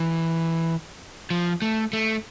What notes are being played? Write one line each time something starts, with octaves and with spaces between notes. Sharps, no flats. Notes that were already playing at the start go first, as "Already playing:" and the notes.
Already playing: E3
F3
A3
A3